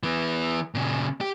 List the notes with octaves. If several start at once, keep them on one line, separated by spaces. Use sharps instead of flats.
E3 B3
A#2 C#3
G4